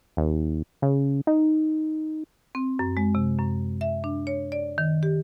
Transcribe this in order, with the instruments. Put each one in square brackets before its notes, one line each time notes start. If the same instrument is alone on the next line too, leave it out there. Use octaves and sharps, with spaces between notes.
[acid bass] D#2
C#3
D#4
[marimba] C4
F#2
G#3
C3
F#2
E5
D4
C#5
D5
D#3
G4